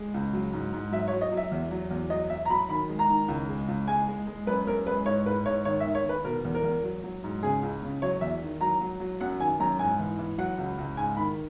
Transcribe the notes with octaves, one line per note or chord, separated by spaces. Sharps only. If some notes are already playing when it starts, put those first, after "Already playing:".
Already playing: G#3
C#2
F#3
G#2
G#2
F#3 E5
C#5
F#3
D#5
F#3
E5
E2
F#3
E2
F#3 D#5
F#3 E5
A#5
F#3 B5
D#3 B5
G#3
A#5
D#3
C#2
G#3
C#2
G#3 G#5
G#3
G#3
F#2 B4
F#2 A#4
G#3 B4
G#2 C#5
G#2 B4
G#2 C#5
D#3 C#5
E5
D#3
C#5
D#3 B4
B2 A#4
E2
A#4
E2
F#3
F#3
G#2
C#3 G#4
C#2
C#3
F#3 C#5
E2 E5
D#3
F#3 A#5
F#3
F#3
F#2 F#5
D#3 G#5
F#2 A#5
G#2 G#5
E3
E3
F#3 F#5
C#2
C#2
G#2 G#5
D#3 B5